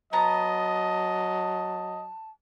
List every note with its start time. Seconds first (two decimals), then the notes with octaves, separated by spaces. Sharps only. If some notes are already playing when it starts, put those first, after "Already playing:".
0.13 F#3 B3 D#5 A5 A#5